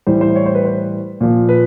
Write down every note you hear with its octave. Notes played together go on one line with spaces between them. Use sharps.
A2 E3 G3 C5
C5
C#5
C5
B4
C5
A#2 F3
B4